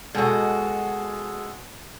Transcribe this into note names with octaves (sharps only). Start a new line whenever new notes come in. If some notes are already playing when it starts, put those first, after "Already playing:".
B2 G#3 F#4 A4 G#5